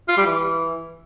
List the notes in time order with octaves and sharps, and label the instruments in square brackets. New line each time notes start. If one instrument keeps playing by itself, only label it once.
[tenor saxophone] F4
G3
E3